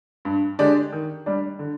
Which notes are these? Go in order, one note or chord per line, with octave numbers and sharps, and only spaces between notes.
G2
D3 G#3 D4 G4
D#3
G3 D4
D3